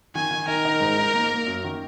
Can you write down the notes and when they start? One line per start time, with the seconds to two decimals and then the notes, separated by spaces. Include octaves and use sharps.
0.15 D#3 G#5
0.31 D#3
0.48 D#4 A#4
0.65 D#4
0.81 G#2
0.97 D#4
1.14 A#3
1.31 A#3
1.47 F#2
1.64 D#3